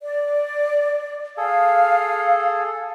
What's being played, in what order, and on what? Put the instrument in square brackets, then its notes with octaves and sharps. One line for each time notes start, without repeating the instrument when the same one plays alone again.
[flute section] D5
[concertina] G#4 A4 [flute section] F5